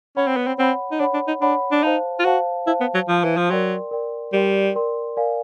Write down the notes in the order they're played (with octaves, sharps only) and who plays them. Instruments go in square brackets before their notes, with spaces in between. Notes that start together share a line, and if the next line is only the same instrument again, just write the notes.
[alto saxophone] C#4 [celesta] C#5 F#5 B5
[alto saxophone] C4
B3
C4
[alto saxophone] C4 [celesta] C#5 F#5 B5
[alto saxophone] D#4
[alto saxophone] D4 [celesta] C#5 F#5 B5
[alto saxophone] D4
D#4
[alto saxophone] D4 [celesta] C#5 F#5 B5
[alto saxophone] D4
[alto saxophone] D#4 [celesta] C5 F5 A5
[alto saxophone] F4
[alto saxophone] F#4 [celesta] C5 F5 A5
[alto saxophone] E4 [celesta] C5 F5 A5
[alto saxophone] B3
F#3
[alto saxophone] F3 [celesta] C5 F5 A5
[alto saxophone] E3
F3
[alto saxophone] F#3 [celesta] A#4 D5 G5 C6
[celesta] A#4 D5 G5 C6
[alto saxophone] G3 [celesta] A#4 D5 G5 C6
[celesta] A#4 D5 G5 C6
A#4 D5 F5 G#5